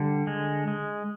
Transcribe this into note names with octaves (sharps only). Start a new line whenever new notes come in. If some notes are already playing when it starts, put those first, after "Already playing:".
Already playing: D3 G3
G#3
G#3